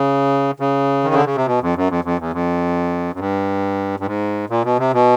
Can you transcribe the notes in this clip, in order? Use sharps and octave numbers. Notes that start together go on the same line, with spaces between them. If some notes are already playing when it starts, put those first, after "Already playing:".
Already playing: C#3
C#3
D#3
D3
C#3
C3
B2
F2
F#2
F2
F2
E2
F2
F#2
G2
G2
G#2
A#2
B2
C3
B2